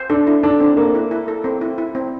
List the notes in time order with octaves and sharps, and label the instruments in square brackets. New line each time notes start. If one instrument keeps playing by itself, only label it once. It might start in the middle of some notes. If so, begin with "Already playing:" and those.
Already playing: [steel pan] C5
[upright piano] D4 [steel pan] A4
[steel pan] E4
[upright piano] D4 [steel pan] A4
[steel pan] C4
[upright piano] A#3 [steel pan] A4
[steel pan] E4
E4
A4
C4
E4
E4
C4